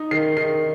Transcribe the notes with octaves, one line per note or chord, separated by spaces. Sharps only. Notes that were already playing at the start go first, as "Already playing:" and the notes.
Already playing: D#4
D#3 C7
D#3 C7